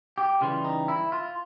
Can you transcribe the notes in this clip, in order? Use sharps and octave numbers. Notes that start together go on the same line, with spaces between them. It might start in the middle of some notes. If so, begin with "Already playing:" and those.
G4
C#3 E3 G3 F4
D#4
E4
F4